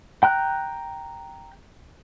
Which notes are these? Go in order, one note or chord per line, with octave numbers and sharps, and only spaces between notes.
G5 A#5 F#6